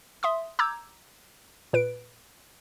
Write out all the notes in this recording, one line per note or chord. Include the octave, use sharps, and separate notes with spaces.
E5 C6 D#6
A#5 D6 E6 G6 G#6
A#2 B4 D7